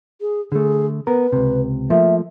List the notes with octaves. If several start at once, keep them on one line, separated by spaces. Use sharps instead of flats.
G#4
D3 A3 G#4
B3 A#4 B4
C#2 C3
F3 A3 A#3 E5